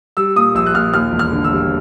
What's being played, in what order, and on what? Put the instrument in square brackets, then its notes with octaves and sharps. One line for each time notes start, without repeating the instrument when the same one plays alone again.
[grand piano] G3 E6
A#2 D#6
A#1 E6
F#6
A#2 F6
D#2 F6
E1
F6
D3
E6
G3